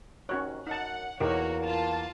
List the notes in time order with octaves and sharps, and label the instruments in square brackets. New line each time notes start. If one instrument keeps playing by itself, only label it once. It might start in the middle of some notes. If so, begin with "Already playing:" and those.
[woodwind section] D#2 C3 D#3 [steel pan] C#4 F#4 C#5 [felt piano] F#6
[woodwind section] F#2 [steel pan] D#4 A5 [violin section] F#5
[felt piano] E2 [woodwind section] A#3 [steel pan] D#4 G4 A#4 [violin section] F#4 C#5
[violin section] F4 A5